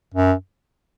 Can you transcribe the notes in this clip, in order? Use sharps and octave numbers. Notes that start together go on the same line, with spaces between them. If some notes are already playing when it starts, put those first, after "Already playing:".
F#2